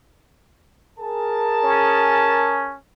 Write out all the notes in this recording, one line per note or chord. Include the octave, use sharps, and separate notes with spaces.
G#4 A#4 A5
C#4